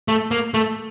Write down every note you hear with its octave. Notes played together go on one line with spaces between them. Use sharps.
A3
A#3
A3